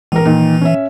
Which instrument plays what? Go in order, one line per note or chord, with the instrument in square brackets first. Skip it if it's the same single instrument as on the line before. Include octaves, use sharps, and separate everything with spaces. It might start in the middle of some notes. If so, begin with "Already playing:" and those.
[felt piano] A#1 A#4 [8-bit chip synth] E3
[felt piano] A#2 D#3
C#4 E5